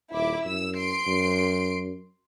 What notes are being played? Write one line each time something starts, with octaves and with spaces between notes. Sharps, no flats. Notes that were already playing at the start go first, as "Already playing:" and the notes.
D#1 E4 D6
F#2 E6
C6 C7 D7
F#2